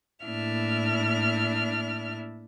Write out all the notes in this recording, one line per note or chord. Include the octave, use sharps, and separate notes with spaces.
A2 A#3 D4 E4 E5 F6